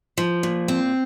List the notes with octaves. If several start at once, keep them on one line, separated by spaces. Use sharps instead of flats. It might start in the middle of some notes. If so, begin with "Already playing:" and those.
F3
A#2
C4